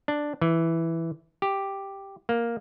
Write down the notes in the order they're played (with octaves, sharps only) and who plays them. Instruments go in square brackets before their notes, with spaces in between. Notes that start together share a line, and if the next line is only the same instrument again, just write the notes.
[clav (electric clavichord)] D4
E3
G4
A#3